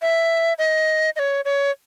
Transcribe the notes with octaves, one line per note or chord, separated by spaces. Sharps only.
E5
D#5
D#5
C#5
C#5